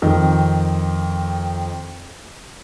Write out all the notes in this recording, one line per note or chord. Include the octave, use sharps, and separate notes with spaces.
F2 D#3